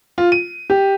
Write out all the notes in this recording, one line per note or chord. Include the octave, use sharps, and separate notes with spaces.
F4
D#7
G4